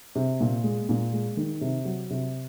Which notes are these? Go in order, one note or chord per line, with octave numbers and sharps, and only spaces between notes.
C3
A#2
G#3
A#2
G#3
D#3
C3
F#3
C3